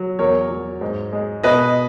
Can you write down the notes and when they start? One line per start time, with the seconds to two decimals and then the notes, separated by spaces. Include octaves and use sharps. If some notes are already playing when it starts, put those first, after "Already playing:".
Already playing: F#3
0.19 E2 A#4 C#5
0.50 F#3
0.81 G#2
1.13 G#3
1.44 B2 B4 D#5